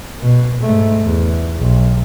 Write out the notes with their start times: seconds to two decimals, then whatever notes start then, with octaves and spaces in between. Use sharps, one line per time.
0.21 B2
0.61 G#2 A3
1.05 E2
1.59 B1